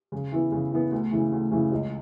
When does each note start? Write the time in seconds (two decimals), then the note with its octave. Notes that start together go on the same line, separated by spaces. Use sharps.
0.12 C#3
0.32 E3 B3
0.52 C#3
0.71 E3 B3
0.91 D2
1.11 C#3 E3
1.32 D2
1.51 C#3 E3
1.72 C#2